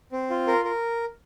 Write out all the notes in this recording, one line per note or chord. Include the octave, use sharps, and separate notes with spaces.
C4
F4
A#4
A#4